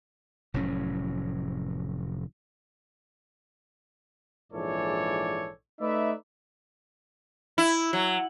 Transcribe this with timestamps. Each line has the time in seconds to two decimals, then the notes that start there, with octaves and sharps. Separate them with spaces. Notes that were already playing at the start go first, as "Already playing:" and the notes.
0.54 F1 A2 F#3 C#4
4.52 A#1 G#2 E3 A4 C#5 D5
5.81 A3 D#4 B4 D5 E5
7.58 E4
7.93 F#3